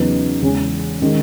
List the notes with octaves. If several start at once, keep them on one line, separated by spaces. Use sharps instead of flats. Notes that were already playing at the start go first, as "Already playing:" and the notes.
Already playing: E2 C#3 F#3 B3 D#4
E2 C#3 E3 G#3 C#4
D#3 G#3 C#4